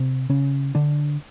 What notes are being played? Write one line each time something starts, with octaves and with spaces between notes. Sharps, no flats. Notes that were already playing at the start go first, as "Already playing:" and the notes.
Already playing: C3 C4
C#3 C#4
D3 D4